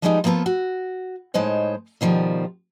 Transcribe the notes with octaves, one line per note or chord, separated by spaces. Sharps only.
F3 G3 G#3 B3 C#4 D#4
F3 A#3 B3 F4 A4
F#4
A2 G#3 D#4 C5 C#5
B2 D#3 F3 G3